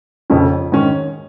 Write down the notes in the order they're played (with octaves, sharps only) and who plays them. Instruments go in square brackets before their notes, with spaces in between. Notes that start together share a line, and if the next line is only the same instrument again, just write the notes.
[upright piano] F1 F2 C#3 F3 C#4
G#2 D#3 C#4